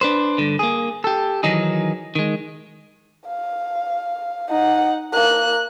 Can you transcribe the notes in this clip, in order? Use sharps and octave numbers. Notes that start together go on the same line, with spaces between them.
D4 B4 C5
G2 D3
A#3 G#4
G4 A4
D#3 E3 F#3 D#4 G#4
D#3 G#3
F5
D#4 F#5
A#3 F#6